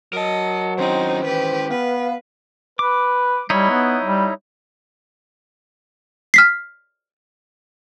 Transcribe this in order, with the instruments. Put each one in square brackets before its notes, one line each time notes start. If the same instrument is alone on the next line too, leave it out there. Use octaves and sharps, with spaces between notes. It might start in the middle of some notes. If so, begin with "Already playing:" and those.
[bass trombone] F#3 [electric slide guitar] A#4 A5 [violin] D#5
[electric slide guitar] D#3 C#4 E4 [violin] C4 D#4 [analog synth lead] C5
[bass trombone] E3 [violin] G4 B4
[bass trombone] B3 [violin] B4 [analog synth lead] F5
[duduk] B4 [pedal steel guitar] D6
[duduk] G3 [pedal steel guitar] D#4 E4 C#5
[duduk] B3
G3
[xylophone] F6 B6 C7